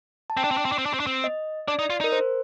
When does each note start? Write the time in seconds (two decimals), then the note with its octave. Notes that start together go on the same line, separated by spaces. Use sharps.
0.30 A5
0.37 C4 G5
0.44 D4
0.51 C4
0.57 D4
0.65 C4
0.72 D4
0.78 C4
0.86 D4
0.93 C4
1.00 D4
1.07 C4
1.24 D#5
1.68 D4 D5
1.79 D#4
1.90 F4
2.01 D#4 A#4
2.12 C5